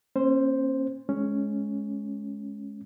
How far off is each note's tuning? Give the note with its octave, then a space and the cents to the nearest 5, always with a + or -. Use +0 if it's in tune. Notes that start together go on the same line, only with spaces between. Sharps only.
A#3 +0 C#4 -40 C5 +0
G#3 +20 C#4 +0